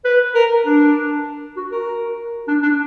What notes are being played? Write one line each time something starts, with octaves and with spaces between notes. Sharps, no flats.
B4
A#4
D4
F#4
A#4
D4
D4